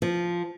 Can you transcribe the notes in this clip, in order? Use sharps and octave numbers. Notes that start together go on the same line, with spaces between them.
F3